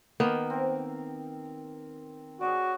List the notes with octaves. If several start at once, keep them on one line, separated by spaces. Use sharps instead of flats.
D#3 A#3 B3
C4 A#4
F#4 G#4 C#5 D5